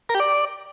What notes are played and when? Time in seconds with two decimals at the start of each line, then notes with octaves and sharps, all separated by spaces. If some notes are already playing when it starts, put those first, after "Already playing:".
0.09 A#4
0.15 G4
0.20 D5